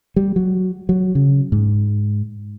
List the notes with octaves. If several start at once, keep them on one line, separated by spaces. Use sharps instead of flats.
G3
F#3
F#3
C#3
G#2